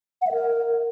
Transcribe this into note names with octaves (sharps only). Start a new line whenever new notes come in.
F#5
E5
A#4